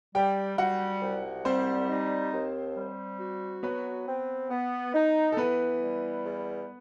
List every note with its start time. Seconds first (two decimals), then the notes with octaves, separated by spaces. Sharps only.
0.15 G3 G4 G5
0.58 G3 F#4 F#5
1.02 C2
1.45 G3 C4 C5
1.89 D#4
2.32 D#2
2.77 G3
3.20 F#4
3.63 F#3 B3 B4
4.07 C4
4.50 B3
4.94 D#4
5.32 A4
5.37 E3 B3 B4
5.81 G3
6.25 E2